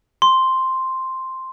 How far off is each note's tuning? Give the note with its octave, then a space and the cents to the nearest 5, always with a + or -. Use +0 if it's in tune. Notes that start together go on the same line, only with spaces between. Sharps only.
C6 +0